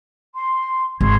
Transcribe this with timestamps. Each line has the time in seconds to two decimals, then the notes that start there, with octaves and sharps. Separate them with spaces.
0.34 C6
1.01 G#1 C6 C#6 G#6